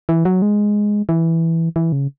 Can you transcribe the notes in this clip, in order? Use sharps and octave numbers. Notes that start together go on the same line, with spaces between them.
E3
F#3
G#3
E3
E3
C#3